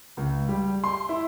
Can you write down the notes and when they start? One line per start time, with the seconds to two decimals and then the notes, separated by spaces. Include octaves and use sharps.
0.17 C#2
0.48 G3
0.84 C6
1.09 E4